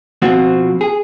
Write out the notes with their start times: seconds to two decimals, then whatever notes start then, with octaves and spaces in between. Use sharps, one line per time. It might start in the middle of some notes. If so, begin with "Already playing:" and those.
0.22 B2 F3 C4 F4 F#4
0.81 G#4